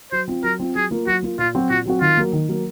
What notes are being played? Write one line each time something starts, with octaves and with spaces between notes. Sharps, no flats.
F#3 C5
C4 F4
F#3 A#4
C4 F4
F#3 G#4
A#3 F4
F#3 F#4
A#3 F4
A#2 F4
F#3 C4 F#4
A#2 F#4
F#3 C4 F#4
D#3 F4
F#3 A#3
D#3
F#3 A#3